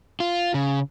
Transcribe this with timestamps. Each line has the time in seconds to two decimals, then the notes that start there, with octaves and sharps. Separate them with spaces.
0.20 F4
0.54 C#3